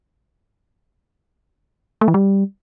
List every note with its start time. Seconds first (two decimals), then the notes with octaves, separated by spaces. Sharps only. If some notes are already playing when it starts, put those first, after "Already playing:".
2.01 A3
2.08 E3
2.14 G3